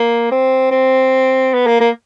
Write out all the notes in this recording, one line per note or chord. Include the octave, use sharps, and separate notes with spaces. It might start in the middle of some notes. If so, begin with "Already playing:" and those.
Already playing: A#3
C4
C4
B3
A#3
A#3